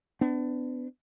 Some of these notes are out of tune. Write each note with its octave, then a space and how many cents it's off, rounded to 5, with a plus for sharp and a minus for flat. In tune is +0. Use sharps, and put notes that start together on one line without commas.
B3 +35 D4 +10